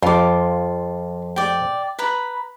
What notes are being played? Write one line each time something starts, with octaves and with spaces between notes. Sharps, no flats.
F2 F4 D6
D5 G5
B4 A#5 B5